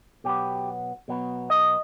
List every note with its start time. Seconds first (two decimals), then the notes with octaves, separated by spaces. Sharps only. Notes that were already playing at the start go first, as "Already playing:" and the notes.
0.24 B2 F#3 B3 G4
1.08 B2 F#3 B3
1.50 D#5